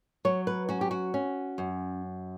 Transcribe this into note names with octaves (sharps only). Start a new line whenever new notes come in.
F#3 C#5
B4
C#4 F#4
G4
F#4
C#4
F#2